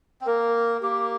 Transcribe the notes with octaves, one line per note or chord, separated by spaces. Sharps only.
C4
A#3 A#4
A#3 G4